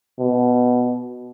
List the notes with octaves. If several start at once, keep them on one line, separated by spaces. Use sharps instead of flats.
B2